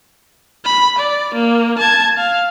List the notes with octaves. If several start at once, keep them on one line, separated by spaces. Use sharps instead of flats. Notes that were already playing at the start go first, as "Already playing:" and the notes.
B5
D5
A#3
A5 G#6
F5